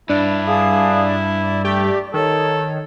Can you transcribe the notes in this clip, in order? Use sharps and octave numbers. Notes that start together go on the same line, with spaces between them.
G2 D4 E4
G#4 F5 D#6
D5
A3 G4
D#3 A4 C#5